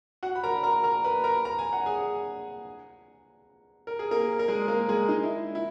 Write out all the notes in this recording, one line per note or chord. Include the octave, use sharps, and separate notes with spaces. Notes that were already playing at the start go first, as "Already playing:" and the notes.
F#4 F#5
B5
A#4 A#5
A#4 A#5
A#4 A#5
B4 B5
A#4 A#5
A#5
G#5
F#5
G#4 G#5
A#4
G#4
A#3 A#4
A#4
G#3 G#4
A#3 A#4
G#3 G#4
D#4
E4
E4